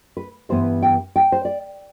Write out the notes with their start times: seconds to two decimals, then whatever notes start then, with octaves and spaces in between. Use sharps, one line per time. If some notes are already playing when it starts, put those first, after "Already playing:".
0.17 B4
0.49 G2 E3 B3 C5
0.82 G5
1.16 G5
1.32 C5
1.45 D5